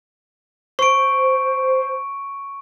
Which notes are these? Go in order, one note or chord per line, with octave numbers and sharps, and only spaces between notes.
C5 C#6 D7